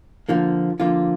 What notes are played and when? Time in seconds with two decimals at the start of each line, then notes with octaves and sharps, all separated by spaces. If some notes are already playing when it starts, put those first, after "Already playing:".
0.29 D3 F3 A#3 F4
0.80 D3 F3 A#3 F4